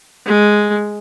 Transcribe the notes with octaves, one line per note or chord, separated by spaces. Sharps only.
G#3